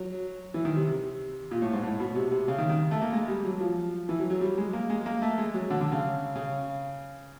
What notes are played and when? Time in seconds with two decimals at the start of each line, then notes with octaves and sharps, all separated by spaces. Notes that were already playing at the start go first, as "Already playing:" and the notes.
Already playing: F#3
0.54 E3
0.65 D#3
0.76 C3
1.51 A#2
1.62 A2
1.73 G#2
1.83 A2
2.00 B2
2.15 C3
2.32 C3
2.48 C#3
2.58 D#3
2.69 D#3
2.91 A3
3.01 A#3
3.12 G#3
3.28 G3
3.45 F#3
3.61 F3
4.09 E3
4.20 F#3
4.30 F#3
4.41 G3
4.58 G#3
4.73 A#3
4.90 G#3
5.06 A#3
5.22 A3
5.38 G#3
5.54 F#3
5.70 D3
5.81 D3
5.92 C#3
6.35 C#3